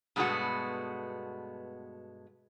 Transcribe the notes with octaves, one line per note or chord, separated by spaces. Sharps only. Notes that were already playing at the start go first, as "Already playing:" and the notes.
G2 B2 G#3 A3 B3 F#4